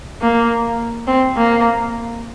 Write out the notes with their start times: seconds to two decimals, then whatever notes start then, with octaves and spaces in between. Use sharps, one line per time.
0.22 A#3
1.07 C4
1.37 A#3